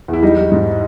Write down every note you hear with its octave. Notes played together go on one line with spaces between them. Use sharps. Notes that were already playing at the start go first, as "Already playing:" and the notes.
E2
E4
G3 D#4
G3
G#2